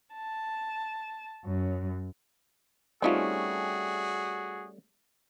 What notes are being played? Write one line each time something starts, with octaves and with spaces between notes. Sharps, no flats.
A5
F#2
G3 A3 C4 C#4 D#4 F4 F#4 G#4